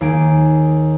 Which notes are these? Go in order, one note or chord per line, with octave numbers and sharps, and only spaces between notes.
D#2 G#4 D7